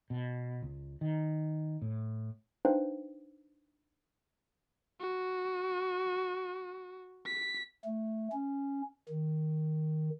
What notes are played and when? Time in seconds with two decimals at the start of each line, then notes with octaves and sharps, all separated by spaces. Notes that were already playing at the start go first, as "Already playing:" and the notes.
0.10 B2
0.62 C#2
1.01 D#3
1.82 A2
2.65 D4 D#4 B4 C5 F5 G5
5.01 F#4
7.27 B6
7.85 A3
8.32 C#4
9.09 D#3